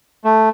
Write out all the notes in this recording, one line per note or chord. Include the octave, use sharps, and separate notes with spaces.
A3